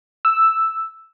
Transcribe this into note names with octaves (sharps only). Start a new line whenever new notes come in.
E6